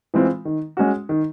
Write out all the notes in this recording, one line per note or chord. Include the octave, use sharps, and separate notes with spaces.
E3 G#3 C4 F4
D#3
G#3 C#4 F#4
D#3